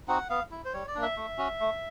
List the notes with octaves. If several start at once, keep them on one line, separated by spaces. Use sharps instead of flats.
C4 D#4 F#4 F#5
B3 F5
E4
C5
G3 C#5
D5
A#3 D4
E5
A3
C#4 F#4
A3